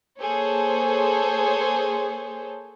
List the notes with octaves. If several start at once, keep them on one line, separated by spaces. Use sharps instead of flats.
A#3 G#4 A4 C5 C#5